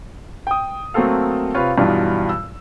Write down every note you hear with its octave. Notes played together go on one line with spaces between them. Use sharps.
G5 D#6
F#3 A3 A#3 C4 A4 F5
C3 F4 B4 C#5 F5
G2 B2 E3 F#3 D4 F4
E6